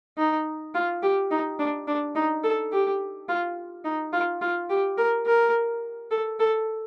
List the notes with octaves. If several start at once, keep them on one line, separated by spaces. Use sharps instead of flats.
D#4
F4
G4
D#4
D4
D4
D#4
A4
G4
F4
D#4
F4
F4
G4
A#4
A#4
A4
A4